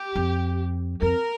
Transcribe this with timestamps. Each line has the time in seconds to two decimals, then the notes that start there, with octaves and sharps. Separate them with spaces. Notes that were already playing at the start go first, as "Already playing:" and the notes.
Already playing: G4
0.15 F2
1.02 F2 A#4